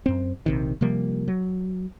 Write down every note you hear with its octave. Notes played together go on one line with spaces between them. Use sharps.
F#2 C4
A#1 C3 D#3
C3 F3 G3 A#3
F#3